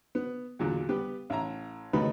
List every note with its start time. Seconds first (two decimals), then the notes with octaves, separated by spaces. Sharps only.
0.15 B3
0.59 E2 A#2 D3 F#3
0.89 G3 B3 G4 B4
1.30 A1 E5 A#5
1.93 C#2 B2 D#3 A3 B3 B5